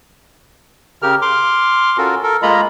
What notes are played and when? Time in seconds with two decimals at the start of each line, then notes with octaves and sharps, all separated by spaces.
1.02 C#3 G4 A#4 F6
1.22 C6 D6 F6
1.98 C#4 F4 F#4 A4 A#4
2.23 A4 A#4
2.42 G#3 A#3 F4 D#5 A#5 B5